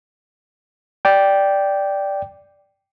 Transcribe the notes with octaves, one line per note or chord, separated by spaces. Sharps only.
D5 G5